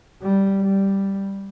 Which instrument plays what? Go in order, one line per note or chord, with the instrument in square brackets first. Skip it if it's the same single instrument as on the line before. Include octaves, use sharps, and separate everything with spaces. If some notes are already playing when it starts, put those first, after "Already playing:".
[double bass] G3
G3